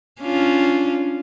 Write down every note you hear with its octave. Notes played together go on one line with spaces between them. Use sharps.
C#4 D4 F4